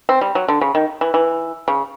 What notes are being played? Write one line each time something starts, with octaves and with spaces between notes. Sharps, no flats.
C4
G3
F#3
D3
C#3
D#3
E3
E3
C#3